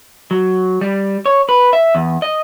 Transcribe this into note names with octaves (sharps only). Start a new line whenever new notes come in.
F#3
G3
C#5
B4
E5
E2
D#5